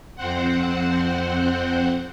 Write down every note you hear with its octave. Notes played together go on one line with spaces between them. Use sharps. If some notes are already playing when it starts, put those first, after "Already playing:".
F2 C4 C5 F#5